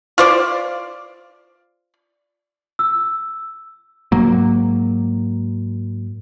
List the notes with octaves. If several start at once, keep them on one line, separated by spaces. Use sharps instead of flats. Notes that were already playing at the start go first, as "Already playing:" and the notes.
F4 C5 D5
E6
G#2 F#3 A#3